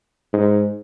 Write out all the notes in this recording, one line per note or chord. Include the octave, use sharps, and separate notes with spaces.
G#2